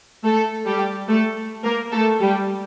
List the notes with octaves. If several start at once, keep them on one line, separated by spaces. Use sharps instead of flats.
A3 A4
G3 G4
A3 A4
A#3 A#4
A3 A4
G3 G4